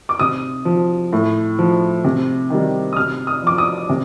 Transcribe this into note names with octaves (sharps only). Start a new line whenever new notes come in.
D6
C3 D#6
F3
A2
F3
C3
D#3 G3
D#6
C3 F6
D#6
F3 D6
D#6
C3